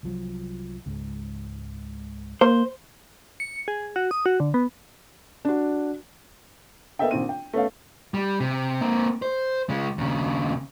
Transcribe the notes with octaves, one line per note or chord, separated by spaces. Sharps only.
C2 F3 F#3
C#2 G#2
A#3 C5
C#7
G#4
F#4
D#6
F#4
D3
B3
D4 F#4
A#3 B3 A4 D#5 E5 G5
A#1 D#3 C4 D#7
G5
A3 B3 C#4 F5
G3
C3
A#3 C4
C5
C#3 G#3
D#2 C#3